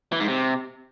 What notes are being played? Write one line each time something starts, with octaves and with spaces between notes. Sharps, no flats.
E3
G#2
C3